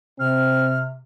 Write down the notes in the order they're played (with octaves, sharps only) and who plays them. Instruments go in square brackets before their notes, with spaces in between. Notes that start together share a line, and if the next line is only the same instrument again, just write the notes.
[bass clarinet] C3 [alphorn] C4 [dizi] F6